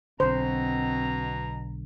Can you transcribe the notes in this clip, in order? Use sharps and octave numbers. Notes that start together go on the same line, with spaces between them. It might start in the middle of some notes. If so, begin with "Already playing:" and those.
B1 B2 D3 C4 C5 A#5